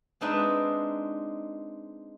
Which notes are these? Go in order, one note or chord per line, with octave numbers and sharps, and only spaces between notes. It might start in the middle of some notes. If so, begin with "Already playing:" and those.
G#3 C4 D4 D#4 B4 E5